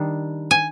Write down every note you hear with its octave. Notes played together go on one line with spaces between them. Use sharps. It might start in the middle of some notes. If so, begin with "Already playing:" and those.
Already playing: D#3 G3 D4
G#5